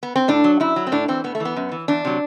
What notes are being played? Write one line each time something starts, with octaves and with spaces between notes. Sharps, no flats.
B3
C4
A2 D4
F#3
F#2 E4
F#3
C4
A2 D4
E3 C4
A2 B3
A3
E3
B3
F#2
E3
E2 D4
C3 F#3